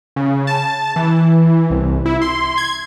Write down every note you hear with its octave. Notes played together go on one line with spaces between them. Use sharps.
C#3
A5
E3
C2
E4
C6
G#6